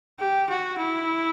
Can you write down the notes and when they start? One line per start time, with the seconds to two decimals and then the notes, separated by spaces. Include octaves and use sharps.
0.19 G4
0.50 F#4
0.78 E4